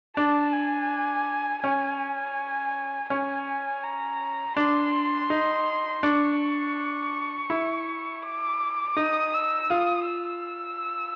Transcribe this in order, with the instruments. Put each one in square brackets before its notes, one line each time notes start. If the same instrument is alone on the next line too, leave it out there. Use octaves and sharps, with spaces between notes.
[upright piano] D4 [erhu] A5
[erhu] G#5
[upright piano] C#4 [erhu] G#5
[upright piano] C#4 [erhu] G#5
[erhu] A#5
[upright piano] D4 [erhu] C6
[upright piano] D#4
[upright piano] D4 [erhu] C#6
[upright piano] E4
[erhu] D6
[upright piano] D#4 [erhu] D#6
[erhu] E6
[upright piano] F4 [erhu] D#6
[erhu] E6